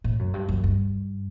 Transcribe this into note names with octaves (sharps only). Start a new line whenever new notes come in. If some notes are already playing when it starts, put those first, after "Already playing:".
A2
F#2
G2
F#2
G2